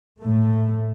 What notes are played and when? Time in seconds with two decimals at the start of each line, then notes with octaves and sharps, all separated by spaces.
0.20 A2 A3